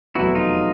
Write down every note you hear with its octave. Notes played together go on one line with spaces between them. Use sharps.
F1 E2 B2 F#3 B3 E4 F#4
D#4 F4